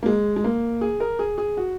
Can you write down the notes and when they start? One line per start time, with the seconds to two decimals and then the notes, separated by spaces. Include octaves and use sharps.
0.03 A#3
0.06 G#3
0.36 G#3
0.44 A#3
0.81 G#4
1.00 A#4
1.19 G#4
1.38 G#4
1.57 F#4